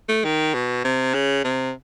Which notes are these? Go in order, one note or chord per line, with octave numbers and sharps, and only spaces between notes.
A3
D#3
B2
C3
C#3
C3